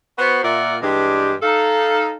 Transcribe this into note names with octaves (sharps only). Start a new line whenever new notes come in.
B3 F#4 C5
A#2 F4 A#4 D5 E5 F#5
G2 E3 G#3 D4 G4
D#4 A4 F5